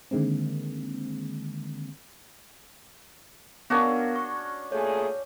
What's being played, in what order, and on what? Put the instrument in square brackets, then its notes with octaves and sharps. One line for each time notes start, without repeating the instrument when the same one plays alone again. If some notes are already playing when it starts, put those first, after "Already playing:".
[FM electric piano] D3 D#3 G#3 A#3 C4
[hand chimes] B3 A#4 F5 [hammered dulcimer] C#4 D4 F#4
[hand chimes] C#6
[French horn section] A#2 A3 G#4 [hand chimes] C#5